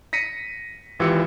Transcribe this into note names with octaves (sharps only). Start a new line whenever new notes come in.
A#6 B6 C#7 D#7
G#1 E3 F4 G4 E6 C#7